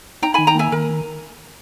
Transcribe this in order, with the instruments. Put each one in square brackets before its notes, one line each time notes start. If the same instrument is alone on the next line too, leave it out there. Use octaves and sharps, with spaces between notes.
[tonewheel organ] D#4 [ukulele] G5 A#5
[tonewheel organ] D#3 [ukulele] G#5 B5
[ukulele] G5 A#5
[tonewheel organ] A#3 [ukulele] E5 G#5
[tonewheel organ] D#3 [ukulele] A#4